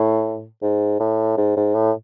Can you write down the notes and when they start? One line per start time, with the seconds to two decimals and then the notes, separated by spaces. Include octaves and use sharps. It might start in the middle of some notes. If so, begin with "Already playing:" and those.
Already playing: A2
0.62 G#2
1.00 A2
1.37 G#2
1.56 G#2
1.74 A2